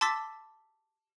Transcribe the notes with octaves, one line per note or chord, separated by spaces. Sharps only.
A5 C6 D6 E6 A6 B6